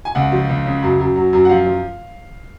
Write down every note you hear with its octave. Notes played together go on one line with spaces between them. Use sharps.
G#5
C#2 F#5
F3
C#2
C#3
F#2
F#2
F#3
F#2
F#5
F3 F5
F3